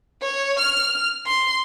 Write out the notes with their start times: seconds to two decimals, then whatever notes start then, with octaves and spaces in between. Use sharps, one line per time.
0.22 C#5
0.59 F6
1.26 C6